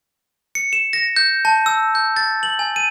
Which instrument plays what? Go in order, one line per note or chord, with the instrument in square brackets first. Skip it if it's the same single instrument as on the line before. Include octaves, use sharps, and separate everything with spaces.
[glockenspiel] C#7
E7
A#6
G6
A5
E6
G6
A6
F#7
G#5
D#7